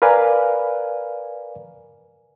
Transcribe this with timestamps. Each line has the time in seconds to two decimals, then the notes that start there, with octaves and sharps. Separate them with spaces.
0.02 A#4 B4 D5 F5 G#5